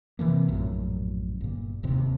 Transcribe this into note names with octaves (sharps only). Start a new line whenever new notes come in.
C3 E3 G#3 A#3
A#1 F#2 A2
G1 A#2
D1 D#2 C3 C4